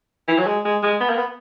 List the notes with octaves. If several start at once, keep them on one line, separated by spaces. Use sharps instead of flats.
E3
F#3
G#3
G#3
G#3
B3
A#3
B3